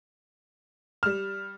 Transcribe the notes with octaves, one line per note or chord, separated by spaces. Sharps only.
G3 F6 E7